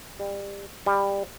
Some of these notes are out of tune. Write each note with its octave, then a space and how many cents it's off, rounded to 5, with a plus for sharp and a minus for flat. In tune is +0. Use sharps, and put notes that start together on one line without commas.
G3 +30
G3 +20